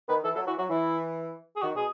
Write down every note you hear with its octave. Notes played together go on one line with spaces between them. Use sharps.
D#3 B4
E3 A4
F#3 A4
E3 F#4
F#3 F#4
E3 E4
G#4
D#3 F#4
B2 G#4